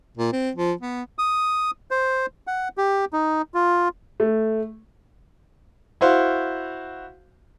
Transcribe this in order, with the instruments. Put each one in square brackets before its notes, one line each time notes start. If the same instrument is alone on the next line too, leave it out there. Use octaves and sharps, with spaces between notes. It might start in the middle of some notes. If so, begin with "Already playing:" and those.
[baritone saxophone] A#2
C4
F3
B3
[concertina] D#6
C5
F#5
G4
D#4
F4
[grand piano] A3
E4 F#4 C5 F5